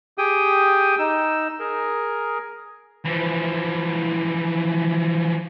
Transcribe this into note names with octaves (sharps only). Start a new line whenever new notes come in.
G4 G#4 G5 D#6
D#4 E6
G#4 A#4
E3 F3